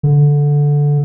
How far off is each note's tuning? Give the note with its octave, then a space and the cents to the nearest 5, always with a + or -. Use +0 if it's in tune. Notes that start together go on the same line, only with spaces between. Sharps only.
D3 -10